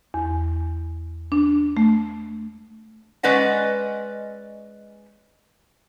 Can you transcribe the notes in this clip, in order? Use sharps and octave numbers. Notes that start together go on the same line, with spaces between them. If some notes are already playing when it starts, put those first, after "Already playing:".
E2
D4
A3
G#3 C#4 B4 D5 D#5 F#5